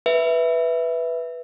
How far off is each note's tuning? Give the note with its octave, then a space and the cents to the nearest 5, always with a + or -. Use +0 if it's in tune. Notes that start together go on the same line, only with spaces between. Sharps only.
B4 +0 E5 +0